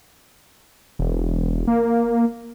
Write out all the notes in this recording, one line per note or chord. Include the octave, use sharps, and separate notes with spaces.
E1
A#3